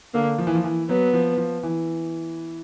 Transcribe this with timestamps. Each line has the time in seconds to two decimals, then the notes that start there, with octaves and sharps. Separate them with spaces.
0.14 D3 A#3
0.38 F3
0.47 E3
0.55 F3
0.64 E3
0.88 F#3 B3
1.14 F3
1.37 F3
1.63 E3